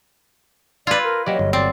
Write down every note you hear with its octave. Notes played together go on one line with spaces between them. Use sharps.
F4 B4 D5 C6 E6 G#6
A#4
F#3 A#3 F#4 G4 D5 D#5
G1
C4 D5